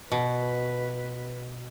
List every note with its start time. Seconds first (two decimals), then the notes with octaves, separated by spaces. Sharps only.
0.12 B2 B4